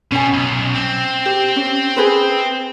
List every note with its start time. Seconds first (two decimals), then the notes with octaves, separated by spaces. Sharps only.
0.12 B2 C#4 G#5
0.34 B1
0.74 C4
1.26 G4
1.56 C#4
1.97 G#4 B4 C5